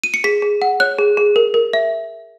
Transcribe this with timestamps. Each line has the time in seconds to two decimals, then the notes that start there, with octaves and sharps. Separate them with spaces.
0.04 D#7
0.14 C#7
0.24 G#4 B6
0.42 G#4
0.62 F#5
0.80 C#5 F#6
0.99 G#4
1.17 G#4
1.36 A#4
1.54 A#4
1.73 E5